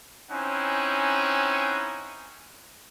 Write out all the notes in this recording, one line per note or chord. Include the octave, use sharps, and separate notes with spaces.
C4 C#4 D#4 E4 F#5 G#5